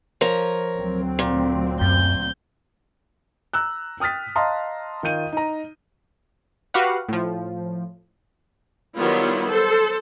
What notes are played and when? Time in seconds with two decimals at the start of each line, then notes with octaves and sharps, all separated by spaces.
0.21 F3 A#4 C#5
0.77 D2 F#3 C4
1.19 A#2
1.81 F#2 G6
3.53 A#5 E6 F#6
4.00 G5 D#6 F6 A6 B6
4.36 D#5 F5 A5 A#5 C6 D#6
5.03 D#3 F4 G6 D#7
5.33 D#4 A#5
6.74 F#4 G4 B4 F5 F#5
7.09 A2 F3
8.96 D#3 F#3 G3 B3 E4 F4
9.47 A4 C5